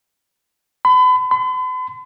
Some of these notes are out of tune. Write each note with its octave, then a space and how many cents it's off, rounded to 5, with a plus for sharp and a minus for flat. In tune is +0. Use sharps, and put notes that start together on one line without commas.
B5 +35
B5 +45